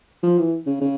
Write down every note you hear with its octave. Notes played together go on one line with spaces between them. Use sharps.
F3
E3
C#3
C#3